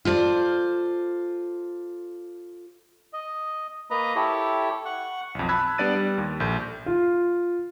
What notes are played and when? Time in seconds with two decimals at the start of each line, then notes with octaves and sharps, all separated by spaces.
0.05 F4 A4 C5 D5
3.13 D#5
3.90 A#3 B4 D#5 A#5
4.16 E4 G4 A4 C#5
4.85 F#5 C#6
5.35 B1 F2
5.49 A5 B5 E6 F#6 G#6
5.78 G3 B3 D4 D5 A6 D#7
5.95 G3
6.18 D#2
6.40 A#1 A4 G6
6.86 F4